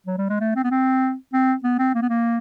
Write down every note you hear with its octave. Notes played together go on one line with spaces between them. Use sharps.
F#3
G3
G#3
A3
C4
B3
C4
C4
B3
C4
A#3
B3
A#3